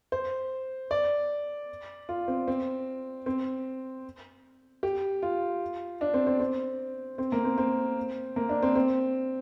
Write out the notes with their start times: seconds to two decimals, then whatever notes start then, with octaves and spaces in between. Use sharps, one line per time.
0.12 C5
0.91 D5
2.09 F4
2.28 C4
2.48 C4
3.26 C4
4.83 G4
5.22 F4
6.01 D4
6.14 C4
6.27 C4
6.40 C4
7.18 C4
7.32 A#3
7.45 C4
7.58 C4
8.36 A#3
8.49 D4
8.63 C4
8.76 C4